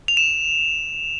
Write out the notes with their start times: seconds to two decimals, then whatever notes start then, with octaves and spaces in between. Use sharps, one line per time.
0.08 F7
0.17 E7